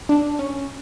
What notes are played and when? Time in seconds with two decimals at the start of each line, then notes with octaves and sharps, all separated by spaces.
0.09 D4
0.39 C#4